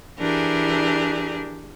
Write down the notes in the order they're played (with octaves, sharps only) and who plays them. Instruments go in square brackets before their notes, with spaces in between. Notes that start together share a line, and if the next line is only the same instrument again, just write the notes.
[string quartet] E3 D4 G4 G#4 A#4